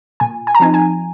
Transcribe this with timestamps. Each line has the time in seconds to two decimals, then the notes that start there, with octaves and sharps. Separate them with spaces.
0.20 A#2 G#5
0.47 G#5
0.55 A#5
0.60 F3 C4 D#4 G#5
0.74 G#5